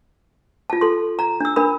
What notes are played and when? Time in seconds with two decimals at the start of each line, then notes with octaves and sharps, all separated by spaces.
0.70 F4 A5
0.81 A4 C6
1.19 A#5
1.40 D4 E6
1.56 D4 A#4 B5